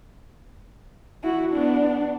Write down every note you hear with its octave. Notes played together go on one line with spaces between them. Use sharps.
E4 F#4
B3 D4